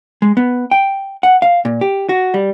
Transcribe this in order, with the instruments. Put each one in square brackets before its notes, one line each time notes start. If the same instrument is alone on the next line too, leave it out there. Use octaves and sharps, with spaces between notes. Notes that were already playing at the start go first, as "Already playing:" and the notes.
[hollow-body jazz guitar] G#3
B3
G5
F#5
F5
A#2
G4
F#4
G3